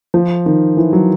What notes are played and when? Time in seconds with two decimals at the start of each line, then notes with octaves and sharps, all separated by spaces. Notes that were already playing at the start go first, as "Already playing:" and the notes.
0.14 F3
0.46 D#3
0.77 E3
0.93 F#3